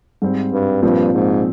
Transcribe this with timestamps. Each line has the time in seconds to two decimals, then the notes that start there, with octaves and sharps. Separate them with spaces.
0.22 G#2 G3 C4
0.53 G2
0.82 G2 A#2 F3 C4
1.14 G#2